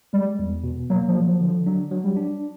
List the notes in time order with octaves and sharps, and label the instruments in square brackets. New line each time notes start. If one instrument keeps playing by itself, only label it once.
[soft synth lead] G3 [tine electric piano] G#3
[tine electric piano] E2
B2
[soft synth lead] F#3 [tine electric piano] A#3
[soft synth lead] F3
[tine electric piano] F#3
[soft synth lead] F3
[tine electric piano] D3
[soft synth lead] F3
[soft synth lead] F#3 [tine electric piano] D4
[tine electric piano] F#3
[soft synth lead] G3
[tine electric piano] D4